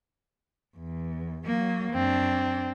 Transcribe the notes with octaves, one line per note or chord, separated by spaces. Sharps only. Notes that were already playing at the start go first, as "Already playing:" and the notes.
E2
F#3 A#3
F#2 C4 D4